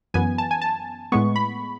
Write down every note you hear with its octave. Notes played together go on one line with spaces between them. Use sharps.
F#2 E3 B3 G#5
A5
G#5
A5
A2 G#3 B3 C#6
B5